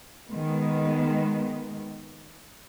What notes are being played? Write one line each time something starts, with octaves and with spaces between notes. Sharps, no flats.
D#3 G#3 B3